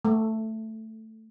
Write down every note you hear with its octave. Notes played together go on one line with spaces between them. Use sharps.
A3